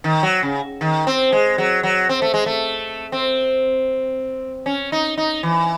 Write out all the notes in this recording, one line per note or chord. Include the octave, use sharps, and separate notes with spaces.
D#3
F#3
C#3
D#3
C4
G#3
F#3
F#3
C4
A3
G#3
A3
C4
C#4
D#4
D#4
E3